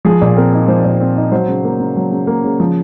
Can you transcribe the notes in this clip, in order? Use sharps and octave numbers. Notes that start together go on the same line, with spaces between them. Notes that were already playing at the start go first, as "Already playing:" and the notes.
F3 G#4
A#2
C4 A#4
D#4
F3 C5
A#2
C4
D#4
F#3 C5
C#3
A#3
C#3
F#3
C#3
A#3
C#3
F3